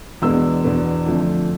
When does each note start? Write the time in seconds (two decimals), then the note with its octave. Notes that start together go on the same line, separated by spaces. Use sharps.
0.22 E2 B2 G#3 B3 D4 E6
0.64 E2 B2 B3 D4
1.06 F2 D3 F3 A3 D4